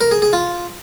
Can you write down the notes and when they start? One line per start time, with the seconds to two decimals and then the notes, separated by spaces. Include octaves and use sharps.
0.01 A#4
0.11 G#4
0.22 G#4
0.33 F4